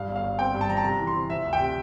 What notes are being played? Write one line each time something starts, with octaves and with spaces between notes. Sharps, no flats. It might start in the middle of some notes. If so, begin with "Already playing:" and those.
Already playing: G2 F5
G1
F5
G1
C4 G5
G2
A5
F3 A#5
A5
C3 A#5
E3
C6
C3
F3 E5
D2
G5
C3